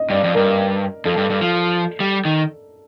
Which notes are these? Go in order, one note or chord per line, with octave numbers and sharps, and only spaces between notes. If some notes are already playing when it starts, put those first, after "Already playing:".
Already playing: D#5
G2 D5
F2
G2 A#4
F2 A4
G2
G2
F3
G3
D#3